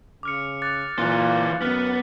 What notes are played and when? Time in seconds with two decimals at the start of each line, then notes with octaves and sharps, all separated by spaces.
0.23 C#3 D6 F6 C#7
0.62 D6 F#6 A6
0.99 A#2 E3 F4
1.62 F#2 B3 F6 B6